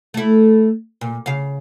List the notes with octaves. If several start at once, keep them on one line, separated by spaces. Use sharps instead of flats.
A3 E4
A#2
C#3 F5